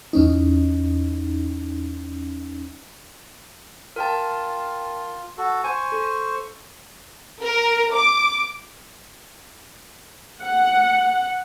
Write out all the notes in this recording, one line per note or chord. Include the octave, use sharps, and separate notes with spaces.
E2 C#4 D#4
F4 A#4 G5 A5
F#4 A4
C5 G#5 C#6
A4
A#4
D6
F#5